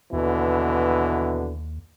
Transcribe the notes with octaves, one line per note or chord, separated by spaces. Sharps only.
D#2 B2 D3 E3